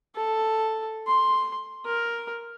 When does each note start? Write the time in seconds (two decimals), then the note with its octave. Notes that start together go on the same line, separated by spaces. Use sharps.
0.16 A4
1.07 C6
1.85 A#4